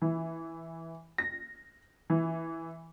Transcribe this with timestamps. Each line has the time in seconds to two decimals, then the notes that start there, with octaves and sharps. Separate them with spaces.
0.02 E3
1.18 A#6
2.10 E3